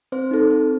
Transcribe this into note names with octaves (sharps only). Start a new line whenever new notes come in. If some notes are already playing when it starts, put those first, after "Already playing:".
C4 C5
D#4 A4
C4